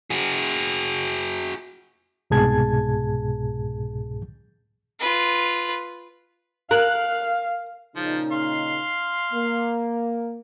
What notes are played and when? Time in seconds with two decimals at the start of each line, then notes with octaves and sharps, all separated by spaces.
0.10 F#4 G#4
2.30 C2 G#2 B2 G#4 A5 G#6
5.00 F4 B4
6.71 A#4 F5 F#6
7.96 A#2 C#3 F3 D#4
8.32 F5 C6
9.32 A#3